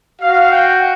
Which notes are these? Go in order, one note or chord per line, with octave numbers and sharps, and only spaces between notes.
F#4 F5
G5